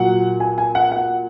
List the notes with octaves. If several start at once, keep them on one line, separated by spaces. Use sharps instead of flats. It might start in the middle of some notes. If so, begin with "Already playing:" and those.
Already playing: A#2 F#3 F#5
G#5
G#5
F#5
F#5